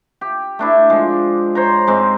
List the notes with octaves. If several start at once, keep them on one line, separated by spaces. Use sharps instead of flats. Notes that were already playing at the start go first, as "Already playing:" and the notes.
G4
A3 D4 E4
F3 G#3
C5 C#5 A#5
G#2 G#3 C4